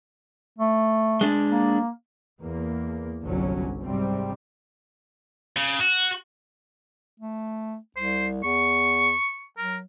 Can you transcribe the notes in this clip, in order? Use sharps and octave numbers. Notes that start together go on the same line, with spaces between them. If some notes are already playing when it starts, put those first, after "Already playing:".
A3
G#3 D4
A#3
E2 A#3
G1 C2 D3 F#3 C#4
G#2 C3 G3 C4
C#3
F#4
A3
C2 C5
E2 C#6
F#3 A#4